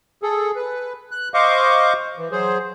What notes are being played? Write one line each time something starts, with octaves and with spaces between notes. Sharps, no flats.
G#4 A4
B4
F#6
C5 D#5 F5 C#6 D6
E3
F#3 G#4 C5